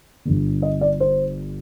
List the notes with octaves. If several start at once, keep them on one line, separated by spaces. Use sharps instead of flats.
G1 G2 D3
D#5
D5
C5